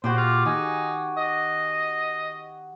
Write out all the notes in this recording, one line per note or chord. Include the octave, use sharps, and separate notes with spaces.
A#2 F#4 G4 C5 D5
F4
D#3 D#4 G#5
D#5